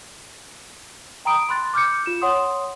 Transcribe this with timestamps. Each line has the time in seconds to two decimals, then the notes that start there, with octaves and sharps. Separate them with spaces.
1.25 G5 A#5 B5 D#6 D7
1.49 B5 C6 F#6 A6
1.74 D6 F6 G6 C#7
2.06 F4 E7
2.22 C#5 F#5 C6 D#6